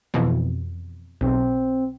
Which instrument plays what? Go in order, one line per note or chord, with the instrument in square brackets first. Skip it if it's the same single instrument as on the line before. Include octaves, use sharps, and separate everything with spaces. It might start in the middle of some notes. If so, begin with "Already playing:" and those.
[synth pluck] F2 B2 E3
[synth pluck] B1 [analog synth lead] C4